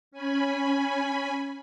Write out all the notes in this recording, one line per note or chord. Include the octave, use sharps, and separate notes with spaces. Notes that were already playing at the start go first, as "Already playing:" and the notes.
C#4 G#5 B5